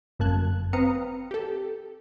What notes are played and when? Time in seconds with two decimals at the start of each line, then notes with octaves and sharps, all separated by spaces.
0.19 G1 F#2 A#3 A5 F#6 G#6
0.73 C4 B4 F5 A#5 D#6 C#7
1.31 G4 A4